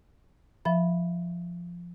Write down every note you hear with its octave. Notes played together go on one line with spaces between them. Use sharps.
F3 E5 B5